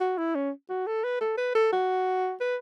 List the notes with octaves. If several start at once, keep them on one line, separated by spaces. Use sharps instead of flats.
F#4
E4
C#4
F#4
A4
B4
A4
B4
A4
F#4
B4